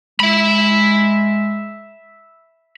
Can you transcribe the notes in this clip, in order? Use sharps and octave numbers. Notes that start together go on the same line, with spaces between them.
G#3 E5 B5